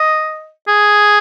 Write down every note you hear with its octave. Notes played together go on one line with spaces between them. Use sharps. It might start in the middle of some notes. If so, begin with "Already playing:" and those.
Already playing: D#5
G#4